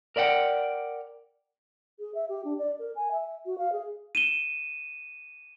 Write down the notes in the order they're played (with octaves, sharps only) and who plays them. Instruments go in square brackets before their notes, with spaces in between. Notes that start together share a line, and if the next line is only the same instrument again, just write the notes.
[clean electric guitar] A#4 D5 E5 F#5 G5
[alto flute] G#4
E5
G4
D4
D5
A#4
G#5
E5
F#4
F5
G#4
[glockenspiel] D#7 E7 G7